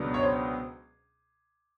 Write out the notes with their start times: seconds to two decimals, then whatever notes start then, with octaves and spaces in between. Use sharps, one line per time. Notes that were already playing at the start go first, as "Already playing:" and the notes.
Already playing: C#2 B2 F#3 B3 D4
0.14 C#5
0.23 C5